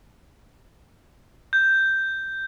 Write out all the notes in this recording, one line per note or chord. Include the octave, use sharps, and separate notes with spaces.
G6